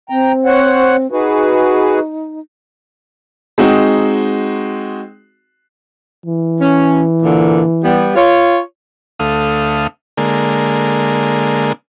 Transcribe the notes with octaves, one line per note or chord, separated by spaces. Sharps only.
C4 G5 A#5
C5 C#5 F#5
D#4 F#4 G#4 B4
G#3 C4 D#4 F#4
E3
C#4
A#2 D3 A#3
G3 B3
F4 C#5
D2 A3 F5 D#6
D3 G#3 A#3